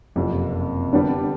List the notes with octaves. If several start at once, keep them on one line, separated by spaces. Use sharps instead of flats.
F#1 F2 C3
D3 G3 B3 D4